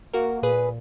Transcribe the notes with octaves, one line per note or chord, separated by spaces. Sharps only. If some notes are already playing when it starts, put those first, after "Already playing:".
A#3 F#4 A#4
A#2 G#4 B4